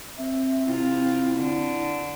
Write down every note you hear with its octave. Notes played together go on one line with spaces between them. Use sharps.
C4 E5
C3 E4 F4
D3